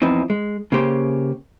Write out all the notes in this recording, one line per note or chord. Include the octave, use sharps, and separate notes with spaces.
E2 E3 F3 C4 D#4
G#3
C#3 A#3 C#4 G4 C5